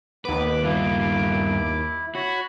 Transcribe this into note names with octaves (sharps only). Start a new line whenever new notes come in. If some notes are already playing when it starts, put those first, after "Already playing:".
D#2 B3 B4 D6
G2 E4 F4
F#4 C#5 B5